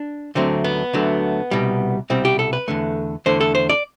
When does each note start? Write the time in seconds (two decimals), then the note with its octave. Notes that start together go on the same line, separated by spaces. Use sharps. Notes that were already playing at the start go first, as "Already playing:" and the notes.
Already playing: D4
0.35 D2 D3 F#3 A3 C4
0.64 B3
0.93 D2 D3 F#3 A3
1.51 C2 B2 G3
2.10 C2 B2 G3 C4
2.25 G4
2.39 A4
2.53 B4
2.68 E2 D3 A3
3.26 E2 D3 A3 C5
3.41 A4
3.55 C5
3.69 D5